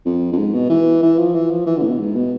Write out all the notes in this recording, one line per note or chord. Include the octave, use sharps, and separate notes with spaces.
F2
F2
G#2
B2
E3
E3
F3
E3
F3
E3
D3
A2
B2
G#2
B2